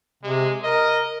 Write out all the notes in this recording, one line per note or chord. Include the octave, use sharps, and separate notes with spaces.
C3 G#3
A#4 D#5